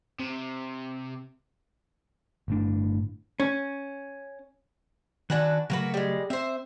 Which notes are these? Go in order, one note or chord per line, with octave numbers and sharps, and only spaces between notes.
C3
G1 A2 D4
C#4
D#3 D4 F#4 B4 G#5
C#3 F#3 A3 A#3 F#4 B4
G3 G#3
C4 C5 E5